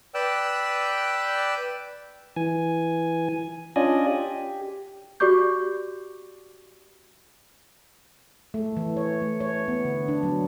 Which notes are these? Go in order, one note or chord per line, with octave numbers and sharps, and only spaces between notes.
B4 D5 G5 E6 F#6
E3 G#5
C#4 D4 F4 D5 D#5 G#5
G4
F#4 G4 D5 C#6 D6 G6
A3
E3
C#5
A3
C#5
B3
D3
D4
F#3